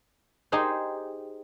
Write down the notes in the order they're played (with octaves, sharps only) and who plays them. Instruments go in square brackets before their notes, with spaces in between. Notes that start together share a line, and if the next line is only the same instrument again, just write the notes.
[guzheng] D#4 G4 G#4 C5